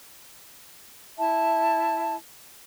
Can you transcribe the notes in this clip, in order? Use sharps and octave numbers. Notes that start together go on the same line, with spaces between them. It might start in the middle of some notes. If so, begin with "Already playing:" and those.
E4 E5 A5